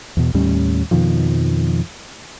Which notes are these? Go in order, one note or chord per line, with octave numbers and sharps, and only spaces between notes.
E2 B2
D#2 A2 G3 C#4
F2 B2 D#3 F3